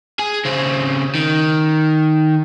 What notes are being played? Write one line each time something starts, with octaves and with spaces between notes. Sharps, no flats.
G#4
C#3 C4
D#3